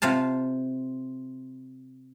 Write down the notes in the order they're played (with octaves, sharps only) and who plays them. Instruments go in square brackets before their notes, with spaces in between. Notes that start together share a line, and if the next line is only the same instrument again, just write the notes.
[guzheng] C3 F4 F5 A5